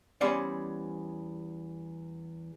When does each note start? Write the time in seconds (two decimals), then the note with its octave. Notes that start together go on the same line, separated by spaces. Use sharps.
0.21 E2 G3 C#4 C5 D5